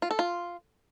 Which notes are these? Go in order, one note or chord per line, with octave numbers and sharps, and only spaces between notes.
F4
A4
F4